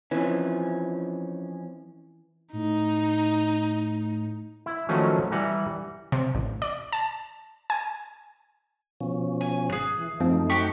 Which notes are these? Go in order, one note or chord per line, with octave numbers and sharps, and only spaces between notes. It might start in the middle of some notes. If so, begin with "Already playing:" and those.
F2 E3 F3 C#4
A2 D#4
E4
D#3 F3 F#3 A3 C#4
E3 G3 F#5 A#5
C3
A1
D5
A5
G#5
B2 F3 C#4
G#5
G#1 G#4 F#6
E3
F#2 F3 A3 C4 D#4
F#4 G4 C#6 B6